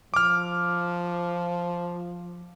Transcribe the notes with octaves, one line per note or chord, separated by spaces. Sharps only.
F3 D6 F6